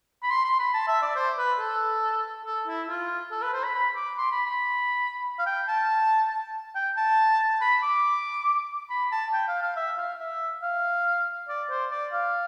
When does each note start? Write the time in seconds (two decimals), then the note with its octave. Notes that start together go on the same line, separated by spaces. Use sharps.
0.23 B5
0.30 C6
0.45 C6
0.59 B5
0.74 A5
0.88 E5
1.02 D5
1.16 C5
1.38 B4
1.59 A4
2.45 A4
2.67 E4
2.88 F4
3.31 A4
3.42 B4
3.53 C5
3.64 B5
3.75 B5
3.96 D6
4.18 C6
4.31 B5
4.46 B5
5.39 F5
5.46 G5
5.68 A5
6.75 G5
6.97 A5
7.61 B5
7.83 D6
8.90 B5
9.12 A5
9.33 G5
9.48 F5
9.62 F5
9.76 E5
9.97 F5
10.19 E5
10.62 F5
11.49 D5
11.70 C5
11.91 D5
12.13 F5